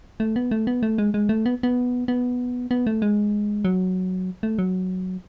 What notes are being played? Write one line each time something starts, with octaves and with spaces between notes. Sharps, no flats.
A3
B3
A3
B3
A3
G#3
G#3
A3
B3
B3
B3
B3
A3
G#3
F#3
A3
F#3